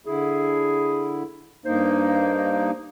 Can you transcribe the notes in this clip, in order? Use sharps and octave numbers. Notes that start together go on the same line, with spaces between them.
D3 E4 G#4
G2 A#3 D#4 C5